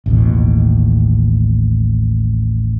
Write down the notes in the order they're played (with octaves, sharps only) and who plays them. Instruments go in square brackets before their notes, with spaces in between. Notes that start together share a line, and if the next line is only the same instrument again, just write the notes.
[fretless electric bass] A1 D#2 B2